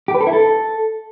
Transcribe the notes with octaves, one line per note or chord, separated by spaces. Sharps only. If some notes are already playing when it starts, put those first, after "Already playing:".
G4
B4
A4
E4
A4